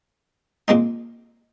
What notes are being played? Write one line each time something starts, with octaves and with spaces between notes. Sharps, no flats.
A#2 G#3 C4 D#4